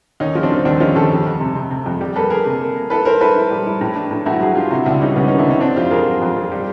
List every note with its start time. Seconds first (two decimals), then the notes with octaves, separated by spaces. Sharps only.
0.20 D#2 C#4 D#4
0.35 F3
0.43 C4 D4
0.51 F3
0.65 D#2 C4 D4
0.80 F3 C#4 D#4
0.95 D#2 G4 A4
1.11 F2
1.26 F2
1.40 C3
1.55 C3
1.70 C3
1.86 F2
2.01 G3
2.16 A#3 A4 B4
2.30 A#3 G#4 A#4
2.46 C3
2.61 A#3
2.76 A#3
2.90 E4 A4 B4
3.05 E4 A#4 C5
3.21 E4 A4 B4
3.36 E4
3.51 G3
3.66 E4
3.81 A2
3.96 D4
4.11 A2
4.26 A2 E4 F#4
4.40 F#3 F#4 G#4
4.55 D4 F4 G4
4.71 C3 E4 F#4
4.86 C#2 D4 E4
5.01 G3 C#4 D#4
5.16 C#2 B3 C#4
5.28 D#3 C#4 D#4
5.38 D4 E4
5.46 C3 C#4 D#4
5.61 D3 C4 D4
5.76 F2 F4 G4
5.91 F2 G#4 A#4
6.06 F#3
6.21 F2
6.36 F2
6.52 G3